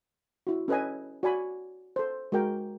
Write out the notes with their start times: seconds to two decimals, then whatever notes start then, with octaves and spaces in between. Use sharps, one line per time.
0.47 E4 F#4
0.68 C#4 A4 B4 D#5 G#5
1.23 F#4 D5 G#5 B5
1.96 A4 C5
2.32 G#3 F#4 A#4 G5